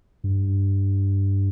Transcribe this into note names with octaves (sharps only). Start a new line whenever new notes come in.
G2